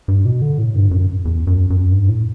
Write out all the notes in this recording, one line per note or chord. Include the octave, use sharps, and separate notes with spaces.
G2
B2
D3
A2
G2
F#2
E2
F#2
F#2
G2
A2